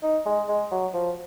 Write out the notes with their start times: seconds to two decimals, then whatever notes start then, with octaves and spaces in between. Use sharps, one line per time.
0.03 D#4
0.26 G#3
0.48 G#3
0.72 F#3
0.94 F3